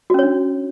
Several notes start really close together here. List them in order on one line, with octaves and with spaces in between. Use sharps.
F#4 C#4 C#5 D4